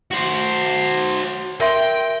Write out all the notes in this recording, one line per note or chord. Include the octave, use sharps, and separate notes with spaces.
F#4 C5
A#4 E5 G5 C6